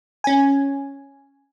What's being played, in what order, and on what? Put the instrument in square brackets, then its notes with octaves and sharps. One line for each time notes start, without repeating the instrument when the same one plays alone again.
[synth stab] C#4 G#5